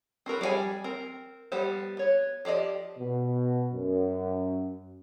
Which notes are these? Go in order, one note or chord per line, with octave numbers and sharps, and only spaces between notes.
C4 F#4 A#4 B4
G3 G#4 C#5 G5 G#5
C4 A#4
G3 B3 G4 C5
B3 C#5
F3 G4 D5 D#5
B2
F#2